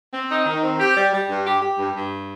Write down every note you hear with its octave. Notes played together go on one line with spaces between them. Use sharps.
C4
D#4
D#3
C4
G4
G3
G3
G2
G4
G4
G2
G2